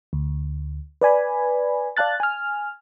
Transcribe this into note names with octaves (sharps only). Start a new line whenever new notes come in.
D2
B4 D5 G#5 B5
D5 F5 A5 F#6 A6
G#5 F6